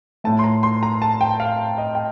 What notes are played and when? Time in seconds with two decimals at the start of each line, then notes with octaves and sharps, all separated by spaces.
0.24 A2 A3 A5
0.39 C6
0.44 A#5
0.63 C6
0.83 A#5
1.02 A5
1.21 G5
1.40 F5
1.78 D#5
1.95 G5